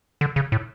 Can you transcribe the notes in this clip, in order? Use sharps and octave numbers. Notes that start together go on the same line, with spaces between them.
D3
C#3
A2